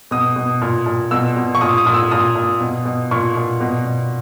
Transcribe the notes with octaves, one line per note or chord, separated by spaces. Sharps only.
B2 D#6
B2
A#2
A#2
B2 E6
B2
C#6
A#2 D#6
D#6
A#2
E6
A#2 D#6
A#2
B2
B2
A#2 C#6
A#2
B2
B2